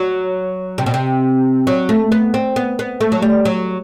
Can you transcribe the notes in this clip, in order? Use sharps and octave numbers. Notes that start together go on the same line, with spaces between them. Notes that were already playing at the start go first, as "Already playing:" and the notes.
Already playing: F#3
C3
B2
C3
F#3
A3
B3
C4
B3
B3
A3
F#3
G3
F#3